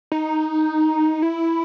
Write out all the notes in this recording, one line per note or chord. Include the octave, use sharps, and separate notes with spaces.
D#4
E4